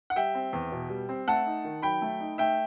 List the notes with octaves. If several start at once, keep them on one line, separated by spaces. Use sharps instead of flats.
F#5
G3 E5 G5
C4
E2
B2
G3
C4
A3 F#5 A5
D#4
D#3
F#3 G5 B5
A3
D#4
A3 E5 G5